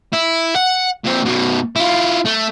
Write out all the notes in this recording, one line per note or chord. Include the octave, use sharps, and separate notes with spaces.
E4
F#5
A#2 C4
F#2 B2
E4 F4
A3